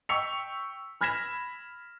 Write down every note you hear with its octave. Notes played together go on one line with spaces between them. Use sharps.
G5 C#6 E6 B6 C#7 F7
B5 F6 G#6 A#6 B6 E7